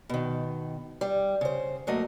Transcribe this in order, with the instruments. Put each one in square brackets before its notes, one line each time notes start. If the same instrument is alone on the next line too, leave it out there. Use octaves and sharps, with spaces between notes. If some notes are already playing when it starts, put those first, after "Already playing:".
[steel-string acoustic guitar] B2 D#3
G3
C#3 C5
F#3 A3 A#3 D#5